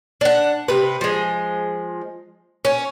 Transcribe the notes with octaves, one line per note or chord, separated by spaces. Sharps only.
D4 F#5
C3 B4
F3 G#3
C#4